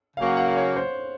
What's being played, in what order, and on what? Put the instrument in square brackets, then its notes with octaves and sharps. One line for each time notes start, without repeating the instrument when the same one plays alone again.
[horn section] C#3 F#3 A#3 C#4 [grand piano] F5
[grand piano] F#5
F#5
F5
C#5
C5